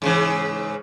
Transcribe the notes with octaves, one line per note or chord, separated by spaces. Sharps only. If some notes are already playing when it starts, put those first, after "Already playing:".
G#2 C#3 E3